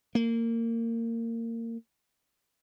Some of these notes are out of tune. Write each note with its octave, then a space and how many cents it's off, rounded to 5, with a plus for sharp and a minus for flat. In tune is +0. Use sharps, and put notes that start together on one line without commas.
A#3 -25